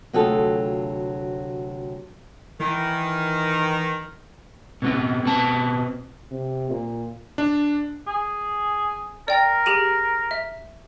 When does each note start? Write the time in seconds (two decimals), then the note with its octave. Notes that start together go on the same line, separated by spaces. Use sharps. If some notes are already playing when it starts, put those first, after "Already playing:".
0.13 D2 C3 F#3 F4 G#4 A4
2.60 D#3 E3
4.82 B2 B3 C4
5.24 B2 B3 C4 A5
6.31 C3
6.70 A#2
7.38 D4
8.07 G#4
9.28 A#4 D5 G5
9.66 G4 G#4 D#7
10.31 E5